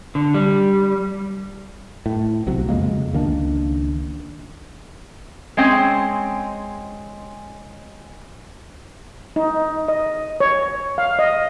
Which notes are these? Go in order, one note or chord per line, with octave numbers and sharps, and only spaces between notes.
D3
G3
A2
B1 C3 F#3
F2 C#3 G#3 A#3
C#2 D#3 A#3 D4
G#3 C4 C#4
D#4
D#5
C#5
F5
D#5